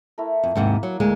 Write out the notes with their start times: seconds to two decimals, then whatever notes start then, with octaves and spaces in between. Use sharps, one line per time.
0.18 A3 E4 A#4
0.44 F2
0.56 D#2 G#2 C3 A#3
0.83 F#3
1.00 D2 G#3 A#3